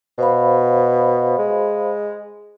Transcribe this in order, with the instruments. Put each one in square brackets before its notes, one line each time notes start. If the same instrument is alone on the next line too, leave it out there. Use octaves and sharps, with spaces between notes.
[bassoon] B2 [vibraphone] C5 F5 B5
[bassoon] G#3